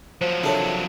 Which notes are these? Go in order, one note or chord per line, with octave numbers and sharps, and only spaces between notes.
F3 F#3 C5
C3 D4 E4 A4 A#4 C#5